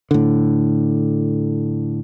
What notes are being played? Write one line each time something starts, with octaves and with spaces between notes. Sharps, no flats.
A2 D3